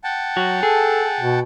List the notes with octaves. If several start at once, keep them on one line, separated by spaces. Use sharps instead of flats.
F#5 G5 A5
F#3 F#4
G#4 A4
B2